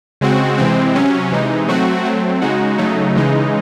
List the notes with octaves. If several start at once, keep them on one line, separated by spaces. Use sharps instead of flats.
C#3 G#3 C4 F#4
C3 E3 G#3 C4
C3 F#3 C#4
C3 E3 G#3 D#4
F#3 A3 C4 F#4
F#3 A3 C4
C#3 G#3 D#4 F#4
C#3 F#3 A3 D#4
C#3 E3 G#3 D#4